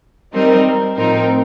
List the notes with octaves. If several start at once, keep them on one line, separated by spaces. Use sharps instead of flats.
G3 C4 D#4 A#4
A2 F3 C4 D#4 A#4